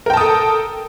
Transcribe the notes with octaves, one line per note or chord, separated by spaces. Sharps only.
A4 A#4 G5 A5 D#6